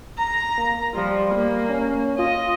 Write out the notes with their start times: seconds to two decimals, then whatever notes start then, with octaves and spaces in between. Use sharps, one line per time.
0.18 A#5
0.58 A#3
0.94 F3 G3
1.35 A#3
1.69 C#4
2.19 F4 D#5